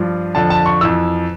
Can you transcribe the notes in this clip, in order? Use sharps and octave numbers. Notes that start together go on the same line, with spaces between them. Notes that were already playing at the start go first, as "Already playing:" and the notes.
Already playing: G2 F3
F2 D3 F3 A5
A5
C#6
F2 E3 E6